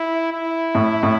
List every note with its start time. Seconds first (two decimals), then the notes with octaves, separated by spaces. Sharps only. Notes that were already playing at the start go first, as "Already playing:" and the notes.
Already playing: E4
0.33 E4
0.75 A2
1.03 A2